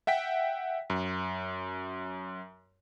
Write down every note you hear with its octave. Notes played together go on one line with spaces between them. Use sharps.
E5 F#5 G5 B6
F#2